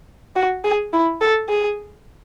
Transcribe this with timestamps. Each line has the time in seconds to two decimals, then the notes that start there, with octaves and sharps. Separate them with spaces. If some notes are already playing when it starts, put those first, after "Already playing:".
0.36 F#4
0.64 G#4
0.93 E4
1.21 A4
1.49 G#4